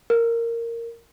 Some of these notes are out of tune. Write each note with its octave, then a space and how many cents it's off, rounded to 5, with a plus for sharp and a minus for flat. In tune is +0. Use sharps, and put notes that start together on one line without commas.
A#4 -10